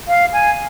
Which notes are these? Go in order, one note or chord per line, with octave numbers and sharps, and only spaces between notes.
F5
G#5